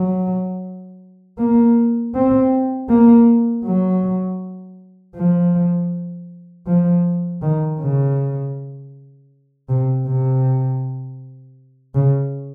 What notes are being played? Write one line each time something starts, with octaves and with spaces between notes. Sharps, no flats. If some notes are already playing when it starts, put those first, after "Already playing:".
Already playing: F#3
A#3
C4
A#3
F#3
F3
F3
D#3
C#3
C3
C3
C#3